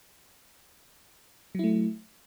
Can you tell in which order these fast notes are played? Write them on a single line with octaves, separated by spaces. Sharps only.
F#3 E4 A3